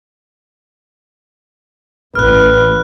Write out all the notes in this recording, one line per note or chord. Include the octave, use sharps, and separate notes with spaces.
A1 B4 F6 F#6